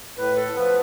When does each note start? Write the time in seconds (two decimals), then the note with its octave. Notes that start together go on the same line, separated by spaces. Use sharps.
0.18 A2 B4
0.37 A4
0.55 F3 B3 B4